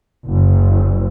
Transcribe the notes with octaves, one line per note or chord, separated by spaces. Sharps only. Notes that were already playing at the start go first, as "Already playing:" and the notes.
F#1